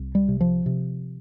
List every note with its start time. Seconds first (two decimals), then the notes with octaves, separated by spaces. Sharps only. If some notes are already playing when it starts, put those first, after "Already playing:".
Already playing: C2
0.15 G3
0.28 C3
0.41 F3
0.66 C3